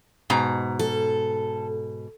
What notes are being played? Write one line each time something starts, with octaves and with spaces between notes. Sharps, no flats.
G#2 B2 A#5
A4